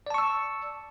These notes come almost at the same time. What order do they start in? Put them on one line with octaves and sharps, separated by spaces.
D5 A5 C#6 E6